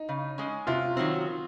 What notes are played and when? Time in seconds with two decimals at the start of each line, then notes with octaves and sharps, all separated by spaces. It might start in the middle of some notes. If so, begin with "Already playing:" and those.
Already playing: D#4
0.09 C#3
0.38 G#3 C#4
0.67 C3 F4
0.97 D#3 F#3 C4